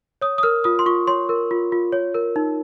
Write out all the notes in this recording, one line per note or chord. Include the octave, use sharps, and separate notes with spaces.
C#5 D#6
D#6
A#4 F6
F4 D#6
C6
F4 C#6
C#5 C6
A#4
F4
F4
C#5
A#4
D#4